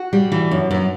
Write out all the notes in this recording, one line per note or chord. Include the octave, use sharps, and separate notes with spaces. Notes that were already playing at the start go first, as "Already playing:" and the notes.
Already playing: F#4
G3
E3
F#2
F#2